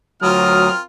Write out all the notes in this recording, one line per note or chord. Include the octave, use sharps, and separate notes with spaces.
D2 F#3 C4 F4 A#4 D#6 F6